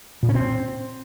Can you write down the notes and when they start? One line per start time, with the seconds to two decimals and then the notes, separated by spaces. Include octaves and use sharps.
0.23 A#2
0.29 C#4
0.35 C4